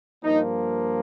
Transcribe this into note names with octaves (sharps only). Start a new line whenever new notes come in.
G2 F3 A#3 D#4